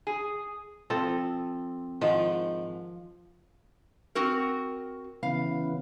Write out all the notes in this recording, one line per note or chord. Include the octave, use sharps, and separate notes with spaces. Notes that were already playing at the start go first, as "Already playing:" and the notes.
G#4
F3 C4 A4
G#2 D#3 F3
C4 F#4 A#4
C#3 E3 B3 F5